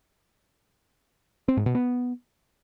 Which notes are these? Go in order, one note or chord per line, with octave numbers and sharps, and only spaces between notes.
C4
G#2
B2
B3